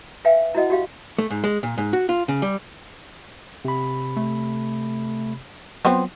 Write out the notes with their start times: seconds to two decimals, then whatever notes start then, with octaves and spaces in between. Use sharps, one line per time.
0.25 B4 E5 F5 G5 G#5
0.55 E4 F#4 D#5 F#5
0.70 F#4 G4 F5
1.18 A3
1.30 G#2
1.44 G#3
1.63 A#2
1.78 G#2
1.93 F#4
2.09 F4
2.28 C#3
2.42 G3
3.65 C3 B5
4.17 A3
5.85 F3 F#3 B3 C4